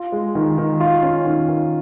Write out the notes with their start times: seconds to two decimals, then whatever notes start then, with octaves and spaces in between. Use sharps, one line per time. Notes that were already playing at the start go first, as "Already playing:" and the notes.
Already playing: F4
0.12 G#3
0.35 D#3
0.58 D#3
0.80 F4
1.03 C#4
1.26 D#3
1.48 D#3